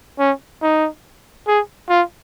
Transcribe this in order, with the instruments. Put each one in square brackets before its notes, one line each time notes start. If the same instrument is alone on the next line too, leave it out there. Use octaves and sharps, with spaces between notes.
[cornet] C#4
D#4
G#4
F4